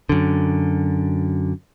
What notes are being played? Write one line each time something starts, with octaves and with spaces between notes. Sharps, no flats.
F#2 D3